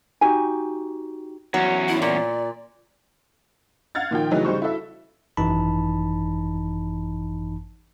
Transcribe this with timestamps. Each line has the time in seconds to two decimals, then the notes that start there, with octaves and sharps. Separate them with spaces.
0.21 D#4 F#4 G4 G#5
1.54 E2 F#3 C#4
1.88 E4
2.02 A#2 D5
3.95 F5 F#5 F6 G#6 A6
4.11 A#2 D#3 F3 G5
4.31 C#3 E3 F#3 A3 D#4
4.45 C#3 G3 D#4 C5 C#6
4.62 E4 F#4 A4 E5
5.37 G#1 F#2 E3 D#4 A5 B5